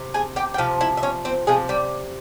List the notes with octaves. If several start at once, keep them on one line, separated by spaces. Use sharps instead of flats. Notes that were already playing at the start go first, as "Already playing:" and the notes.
Already playing: C3
G#4 G#5
G4 G5
G5
C3 F3 F5
E4 E5
E5
C#4 C#5
C4 C5
C3 F3 G#3 G#4
G3 G4